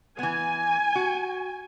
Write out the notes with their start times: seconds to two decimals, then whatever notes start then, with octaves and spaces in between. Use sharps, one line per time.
0.19 E3 B3 G#5
0.95 F#4